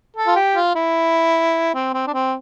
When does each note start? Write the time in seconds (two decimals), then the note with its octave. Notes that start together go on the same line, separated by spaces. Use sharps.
0.16 A4
0.27 F4
0.36 G4
0.55 F4
0.75 E4
1.74 C4
1.94 C4
2.07 D4
2.14 C4